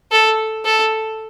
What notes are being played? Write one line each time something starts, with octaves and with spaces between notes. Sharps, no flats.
A4
A4